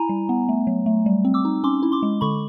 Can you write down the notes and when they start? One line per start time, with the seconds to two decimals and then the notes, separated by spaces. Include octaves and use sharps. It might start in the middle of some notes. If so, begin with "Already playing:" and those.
Already playing: E4 G#5 A#5
0.09 G3
0.29 B3
0.49 A3
0.67 F#3
0.86 A3
1.06 G3
1.25 C4
1.34 D6 E6
1.45 D#4
1.64 C#4 C6 D6
1.83 E4
1.92 C6 D6
2.02 G#3
2.21 D3 B5 C#6